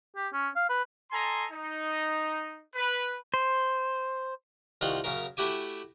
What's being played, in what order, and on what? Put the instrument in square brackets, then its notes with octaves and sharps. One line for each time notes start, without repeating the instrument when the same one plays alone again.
[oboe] G4
C#4
F5
B4
[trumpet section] A4 D#5 G#5 A#5 C6
D#4
B4
[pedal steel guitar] C5
[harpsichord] C2 D#3 F4 F#5 C6 C#6
F#2 C#3 A#4
A3 E4 F#4 G4 G#5